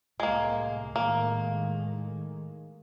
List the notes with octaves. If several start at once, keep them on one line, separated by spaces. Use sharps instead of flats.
C2 A2 G#3 A#3
A2 D#3 G#3 A#3